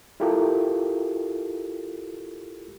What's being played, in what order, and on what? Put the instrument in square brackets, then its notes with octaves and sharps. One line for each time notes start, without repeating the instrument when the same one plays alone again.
[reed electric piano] E4 F4 G4 A4 A#4